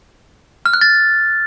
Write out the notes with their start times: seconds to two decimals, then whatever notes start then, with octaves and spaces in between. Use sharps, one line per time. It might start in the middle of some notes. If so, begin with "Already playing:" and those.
0.66 F6
0.73 F#6
0.81 A6